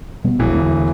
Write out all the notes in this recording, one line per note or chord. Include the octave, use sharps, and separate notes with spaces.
B2 G3 B3
E1 A#1 E3
D2